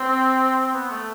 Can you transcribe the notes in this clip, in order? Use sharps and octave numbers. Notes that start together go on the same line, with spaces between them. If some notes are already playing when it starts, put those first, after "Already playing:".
Already playing: C4
B3
A3